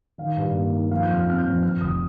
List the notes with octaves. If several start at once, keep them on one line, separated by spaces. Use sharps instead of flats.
D#3 F5
G2
A#3
D#4
F3 F5
G6
F2
F6
C4 F6
G6
F2
F2 F6
F1 D#6